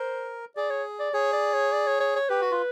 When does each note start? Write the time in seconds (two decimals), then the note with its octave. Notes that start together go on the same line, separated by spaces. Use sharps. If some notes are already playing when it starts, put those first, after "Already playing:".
Already playing: A#4 C5
0.57 G#4 D5
0.70 C#5
0.99 D5
1.14 G#4 C#5
1.33 D5
1.53 C#5
1.72 D5
1.87 C#5
2.00 C#5
2.16 C#5
2.29 G4 B4
2.41 F#4
2.51 F4